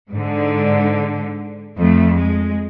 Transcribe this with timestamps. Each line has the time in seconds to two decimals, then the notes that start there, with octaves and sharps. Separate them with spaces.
0.12 G#2 D3
1.79 F2 A3
2.16 G#3